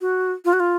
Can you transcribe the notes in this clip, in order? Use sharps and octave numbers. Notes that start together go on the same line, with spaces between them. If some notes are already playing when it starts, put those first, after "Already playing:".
F#4
F4
F#4
F4